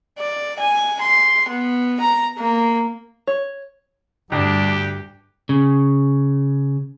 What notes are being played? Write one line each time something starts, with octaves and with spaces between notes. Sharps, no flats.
D5
G#5
C6
B3
A#5
A#3
C#5
D2 G2 D4 G4
C#3